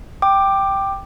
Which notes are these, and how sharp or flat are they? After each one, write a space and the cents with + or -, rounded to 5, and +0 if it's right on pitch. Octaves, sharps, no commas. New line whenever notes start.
G5 +0 D6 +15